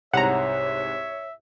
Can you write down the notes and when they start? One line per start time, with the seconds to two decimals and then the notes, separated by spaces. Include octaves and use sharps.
0.14 C2 G#2 C#5 E5 F#5 A#5